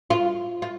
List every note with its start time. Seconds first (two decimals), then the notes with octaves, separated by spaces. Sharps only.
0.10 F4
0.62 F4